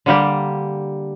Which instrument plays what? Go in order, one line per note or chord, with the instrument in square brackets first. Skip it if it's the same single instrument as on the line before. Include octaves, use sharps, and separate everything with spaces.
[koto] D3 G3 A#3 G4